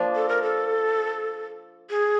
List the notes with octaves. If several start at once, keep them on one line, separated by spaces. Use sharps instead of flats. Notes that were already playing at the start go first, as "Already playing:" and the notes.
Already playing: F3 A#3 D4
A4
A#4
A4
G#4